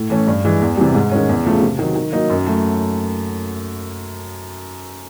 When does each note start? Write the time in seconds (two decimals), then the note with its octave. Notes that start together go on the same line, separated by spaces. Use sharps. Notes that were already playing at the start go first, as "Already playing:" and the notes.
Already playing: A2
0.10 E3 A3 C#4
0.27 G2
0.45 E3 G#3
0.61 E2
0.77 C3 E3 G3
0.95 G#2
1.12 D#3 G#3 C#4
1.29 E2
1.46 C#3 F3 A3
1.62 C3
1.79 D#3 F#3
1.96 D#3
2.13 F#3 A#3 D#4
2.30 F#2
2.46 F#3 A3